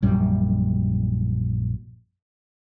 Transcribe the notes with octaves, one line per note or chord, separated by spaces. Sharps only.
A#1 F#2 G3